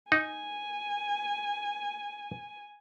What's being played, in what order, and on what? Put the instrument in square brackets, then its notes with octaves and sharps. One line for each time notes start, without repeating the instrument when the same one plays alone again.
[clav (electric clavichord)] D#4 [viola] G#5